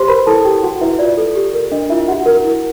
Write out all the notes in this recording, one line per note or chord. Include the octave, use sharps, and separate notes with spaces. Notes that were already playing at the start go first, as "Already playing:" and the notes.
Already playing: G4 C5 C6
A#4 B4 B5
E4 A4 A5
G4 G5
F#4 F#5
E4 B4 E5
F4 D5
A4
G4
A#4
D4 D#5
E4 F4 E5
F#4 G4 F#5
A#4
E4